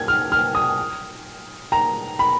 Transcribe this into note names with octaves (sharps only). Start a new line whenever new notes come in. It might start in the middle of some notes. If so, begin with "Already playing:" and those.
Already playing: G#6
F6
F6
D#6
A#5
B5